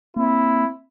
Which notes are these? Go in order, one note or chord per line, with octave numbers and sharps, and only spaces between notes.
A#3 C4 E4